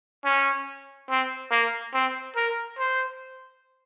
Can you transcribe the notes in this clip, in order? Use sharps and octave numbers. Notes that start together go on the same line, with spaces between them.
C#4
C4
A#3
C4
A#4
C5